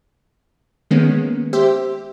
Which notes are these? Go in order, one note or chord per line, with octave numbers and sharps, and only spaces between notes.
D#3 G#3 A#3 B3 C#4
G4 C5 E5